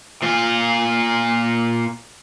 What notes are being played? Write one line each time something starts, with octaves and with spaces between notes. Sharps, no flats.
A#2 F4